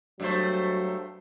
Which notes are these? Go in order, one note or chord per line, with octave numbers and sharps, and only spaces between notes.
G2 F#3 A3 C5